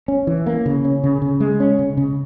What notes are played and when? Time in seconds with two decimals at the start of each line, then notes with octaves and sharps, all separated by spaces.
0.08 C#4
0.27 E3
0.46 A#3
0.66 C#3
0.85 C#4
1.04 C#3
1.22 C#3
1.40 G#3
1.60 C#4
1.79 C#3
1.97 C#3